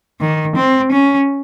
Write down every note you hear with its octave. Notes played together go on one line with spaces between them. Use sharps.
D#3
C4
C#4